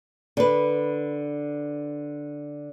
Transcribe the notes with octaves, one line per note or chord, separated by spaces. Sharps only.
D3 B4